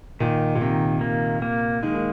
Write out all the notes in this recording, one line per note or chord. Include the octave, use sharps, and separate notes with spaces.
A#2 D#3
A#2
C3 D#3
A#3
A#3
D#3 G#3
D#3